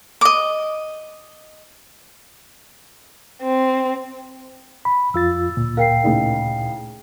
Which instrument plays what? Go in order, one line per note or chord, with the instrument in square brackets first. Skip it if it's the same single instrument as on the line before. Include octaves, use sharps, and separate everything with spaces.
[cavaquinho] D#5 D6
[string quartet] C4
[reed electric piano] B5
[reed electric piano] F2 F4 A6 [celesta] E6
[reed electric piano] D2 A#2
[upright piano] A#4 [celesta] F5 G5 C7
[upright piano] A2 C#3 D#4